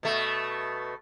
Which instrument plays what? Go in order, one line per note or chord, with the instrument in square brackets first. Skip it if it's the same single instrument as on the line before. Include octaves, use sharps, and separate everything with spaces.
[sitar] B2 A3